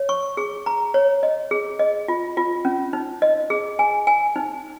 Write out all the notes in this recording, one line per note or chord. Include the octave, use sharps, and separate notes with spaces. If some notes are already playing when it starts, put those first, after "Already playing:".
Already playing: C#5
C#6
G#4
A#5
C#5
D#5
G#4
D#5
F4
F4
C#4
D#4
D#5
G#4
G#5
G#5
D#4